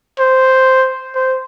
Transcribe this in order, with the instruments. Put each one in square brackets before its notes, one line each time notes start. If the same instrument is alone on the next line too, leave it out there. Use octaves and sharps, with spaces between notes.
[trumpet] C5
C5